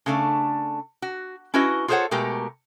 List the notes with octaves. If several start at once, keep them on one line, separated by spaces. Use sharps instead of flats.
C#3 A3 D4
F#4
C#4 E4 F#4 B4 D#5
F4 G#4 A4 C5 C#5 F#5
B2 G#3 A3 G4 A#4